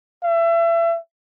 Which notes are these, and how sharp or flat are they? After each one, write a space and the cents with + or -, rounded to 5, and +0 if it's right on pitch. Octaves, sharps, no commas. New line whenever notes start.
E5 +30